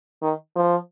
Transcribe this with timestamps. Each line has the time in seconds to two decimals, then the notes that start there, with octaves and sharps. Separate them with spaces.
0.22 D#3
0.56 F3